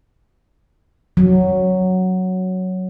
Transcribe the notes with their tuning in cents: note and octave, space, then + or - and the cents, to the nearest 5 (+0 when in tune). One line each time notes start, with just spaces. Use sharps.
F#3 +0